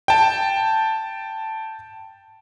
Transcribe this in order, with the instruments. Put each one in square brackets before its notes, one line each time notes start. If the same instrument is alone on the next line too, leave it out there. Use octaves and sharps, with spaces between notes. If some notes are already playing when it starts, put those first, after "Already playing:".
[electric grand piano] G5 A5